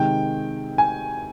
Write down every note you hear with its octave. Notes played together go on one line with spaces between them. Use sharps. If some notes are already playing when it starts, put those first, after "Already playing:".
Already playing: C3 D#3 G#3 G5
G#5